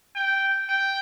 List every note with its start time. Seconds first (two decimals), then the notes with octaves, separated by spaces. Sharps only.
0.16 G5
0.69 G5